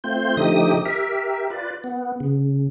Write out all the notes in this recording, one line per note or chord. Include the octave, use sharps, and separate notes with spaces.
A3 C4 F4 C5 G6
D3 F3 A3 D#4 G4 D#6
G4 A#4 E5
F4 B4 D5
B3
C#3